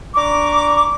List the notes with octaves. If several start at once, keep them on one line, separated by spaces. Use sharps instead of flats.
D4 A#5 C#6 D6